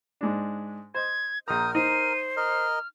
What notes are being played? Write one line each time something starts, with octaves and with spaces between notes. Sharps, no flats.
G#2 G#3 D4
C5 D#5 G#6
A#1 A#4 A#5 D#6 G6
D#4 C5 D#7
A#4 D#5 F6